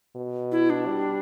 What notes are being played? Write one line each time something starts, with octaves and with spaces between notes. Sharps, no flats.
B2
E4
D4
G3